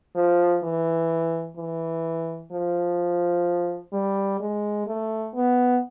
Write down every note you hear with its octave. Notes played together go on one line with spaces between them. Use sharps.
F3
E3
E3
F3
G3
G#3
A3
B3